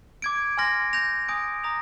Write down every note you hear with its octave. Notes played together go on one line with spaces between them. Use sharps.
D6 G#6 D7
G#5 C6 F6 A#6 D7
G6 A#6 F7
G#5 D#6 G6 D7
A#5 D#6 A#6 F7